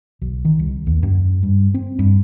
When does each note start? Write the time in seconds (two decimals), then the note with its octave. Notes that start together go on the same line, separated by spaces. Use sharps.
0.22 B1
0.45 D#3
0.59 C2
0.87 D#2
1.03 F#2
1.43 G2
1.74 C4
1.99 G2